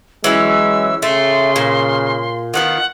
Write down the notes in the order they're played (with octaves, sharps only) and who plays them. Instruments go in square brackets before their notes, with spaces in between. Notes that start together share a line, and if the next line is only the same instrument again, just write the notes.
[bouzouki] E3 F#3 C#4 [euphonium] G#3 [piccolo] E6
[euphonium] C#3 [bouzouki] A3 E5 [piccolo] C6
[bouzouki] A#2
[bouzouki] D#3 F3 B3 [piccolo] F#5